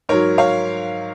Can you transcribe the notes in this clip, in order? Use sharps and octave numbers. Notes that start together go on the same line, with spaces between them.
G#2 F#3 A#4 C#5
C#5 F5